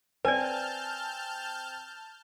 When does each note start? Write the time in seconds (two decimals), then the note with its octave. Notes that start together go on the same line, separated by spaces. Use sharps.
0.25 C4 B4 D5 G#5 A5 F6 G6 G#6